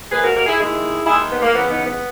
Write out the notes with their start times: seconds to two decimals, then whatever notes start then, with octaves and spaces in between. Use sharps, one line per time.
0.11 A#2 G#3 G#4 B4
0.23 F#4 A#4
0.34 F#4 A#4
0.47 E4 G#4
0.58 D#2 D#3 G#3 E4 G#4
1.06 D#2 D#3 G#3 E4 G#4
1.31 B3
1.42 A#3
1.54 E2 C#3 E3 B3
1.69 B3 D#4
1.85 B3